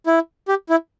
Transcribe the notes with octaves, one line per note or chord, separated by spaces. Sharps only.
E4
G4
E4